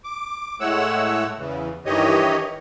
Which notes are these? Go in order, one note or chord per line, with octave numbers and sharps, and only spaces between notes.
D6
A2 G#3 A3 C#5 F#5 E6
E2 C#3 E3
G2 D#3 E3 G4 C#5 D#5